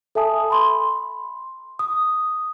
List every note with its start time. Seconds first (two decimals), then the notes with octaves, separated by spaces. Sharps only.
0.15 A4 E5 G#5 A5 D#6
0.50 B5 C6
1.79 D#6